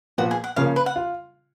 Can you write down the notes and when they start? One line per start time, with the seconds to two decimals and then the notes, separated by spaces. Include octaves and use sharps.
0.18 A#2 F3 B3 F#4
0.31 G#4
0.44 F#5
0.56 C#3 F3 A#3 C#4 F5
0.76 B4
0.86 F#5
0.96 F4